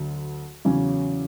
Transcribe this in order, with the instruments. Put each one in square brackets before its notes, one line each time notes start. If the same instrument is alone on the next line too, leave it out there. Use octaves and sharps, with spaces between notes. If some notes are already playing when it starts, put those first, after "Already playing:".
Already playing: [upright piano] D2 D3 F#3
E2 C#3 F#3 C#4